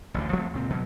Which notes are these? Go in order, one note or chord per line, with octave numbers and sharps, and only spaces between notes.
A1 D2 D3
E1 F3 A3 C4
C#2 A#2 C4
B2 F#3